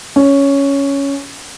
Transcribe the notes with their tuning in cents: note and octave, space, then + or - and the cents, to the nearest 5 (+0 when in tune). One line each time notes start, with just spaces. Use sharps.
C#4 +5